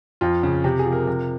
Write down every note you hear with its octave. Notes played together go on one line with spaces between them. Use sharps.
F2 F4
C#3
C3 G4
G#4
F3
A#4
C3